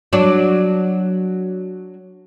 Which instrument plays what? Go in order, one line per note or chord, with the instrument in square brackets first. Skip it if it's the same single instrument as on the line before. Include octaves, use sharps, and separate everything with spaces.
[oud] F#3 D4